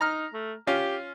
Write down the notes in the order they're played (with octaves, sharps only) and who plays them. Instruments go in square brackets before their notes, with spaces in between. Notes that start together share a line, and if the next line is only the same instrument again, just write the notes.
[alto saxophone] D#4 [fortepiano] A#5 F6
[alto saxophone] A3
[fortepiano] C#4 F4 [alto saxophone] G4